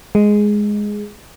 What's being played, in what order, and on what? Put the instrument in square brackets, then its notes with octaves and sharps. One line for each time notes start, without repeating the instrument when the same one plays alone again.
[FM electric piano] G#3